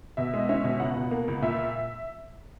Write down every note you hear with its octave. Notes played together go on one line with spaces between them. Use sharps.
B2 E5
G#3 D#5
C#4 E5
B2
C#2 F#5
B2
A#3
C#2
A#2 E5